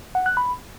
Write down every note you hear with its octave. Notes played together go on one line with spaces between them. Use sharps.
F#5
F#6
B5